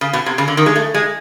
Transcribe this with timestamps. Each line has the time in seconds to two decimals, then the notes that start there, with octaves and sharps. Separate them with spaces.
0.01 C#3
0.13 B2
0.26 C3
0.38 C#3
0.48 D3
0.57 D#3
0.66 G#3
0.76 A3
0.94 G#3